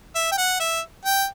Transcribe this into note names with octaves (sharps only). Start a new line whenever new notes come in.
E5
G5
F#5
E5
G5